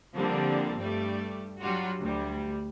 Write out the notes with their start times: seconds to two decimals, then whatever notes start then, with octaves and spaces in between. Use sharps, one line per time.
0.17 D3 F3 G3 A#3 C4 D4
0.79 G2 G3 A3 D5
1.61 F#3 G3 D4 F4 F#4
1.98 D2 G3